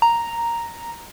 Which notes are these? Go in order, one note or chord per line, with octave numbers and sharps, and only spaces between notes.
A#5